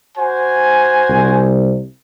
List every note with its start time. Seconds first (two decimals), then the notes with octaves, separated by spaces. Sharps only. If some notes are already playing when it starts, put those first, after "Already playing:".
0.16 F#4 C5 G#5
1.09 C2